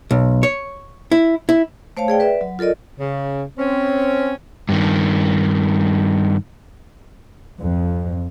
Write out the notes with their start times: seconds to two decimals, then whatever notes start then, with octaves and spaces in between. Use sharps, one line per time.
0.11 B1
0.43 C#5
1.12 E4
1.49 E4
1.97 A3 C5 C#5 F5 A5
2.08 G#4 D5 G5
2.20 B4 D5 E5
2.41 F#3
2.59 F4 A4 A#4 D5 D#5
2.99 C#3
3.58 C4 C#4
4.69 G2 D#3
7.61 F2